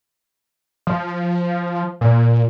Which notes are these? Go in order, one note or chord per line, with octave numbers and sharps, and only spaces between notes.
F3
A#2